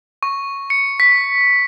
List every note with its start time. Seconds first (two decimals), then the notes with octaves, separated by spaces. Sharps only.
0.23 C#6
0.70 C#7
1.00 B6